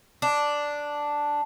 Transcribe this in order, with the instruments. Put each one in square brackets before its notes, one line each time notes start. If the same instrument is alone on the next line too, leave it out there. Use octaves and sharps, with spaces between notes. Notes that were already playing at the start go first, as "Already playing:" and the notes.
[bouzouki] D4